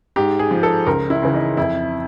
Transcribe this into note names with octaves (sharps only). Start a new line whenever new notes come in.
G#2 G4
G#4
F3
A4
C#2 A#4
E4
C#3 E3
D#4
F2 E4